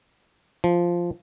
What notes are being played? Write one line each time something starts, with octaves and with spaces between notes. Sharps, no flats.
F3